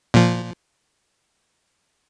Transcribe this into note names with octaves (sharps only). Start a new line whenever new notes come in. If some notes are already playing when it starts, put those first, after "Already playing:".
A#2 F3